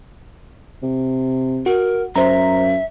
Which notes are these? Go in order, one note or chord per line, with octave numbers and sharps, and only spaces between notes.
C3
F#4 A#4
F#2 C5 E5 A#5